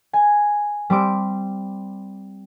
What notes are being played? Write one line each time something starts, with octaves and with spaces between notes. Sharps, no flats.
G#5
G3 C4 D6 D7